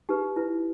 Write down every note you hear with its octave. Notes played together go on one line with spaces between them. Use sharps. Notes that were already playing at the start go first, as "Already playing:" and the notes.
D#4 G4 B4
E4 B4